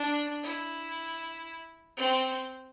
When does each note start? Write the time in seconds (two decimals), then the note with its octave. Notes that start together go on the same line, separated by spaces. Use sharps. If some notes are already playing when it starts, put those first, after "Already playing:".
Already playing: D4
0.43 E4
1.97 C4